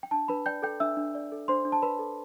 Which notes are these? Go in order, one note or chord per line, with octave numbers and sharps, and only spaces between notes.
G5
D4 A5
D4 B4 B5
D5 G5 G6
A4 G5 G6
D4 E5 E6
D4
D5
A4
D4 C5 C6
D4
A5
B4 D5 B5
A4